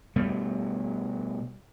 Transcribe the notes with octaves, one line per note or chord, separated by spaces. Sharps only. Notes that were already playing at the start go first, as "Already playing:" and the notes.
B2 G3 A3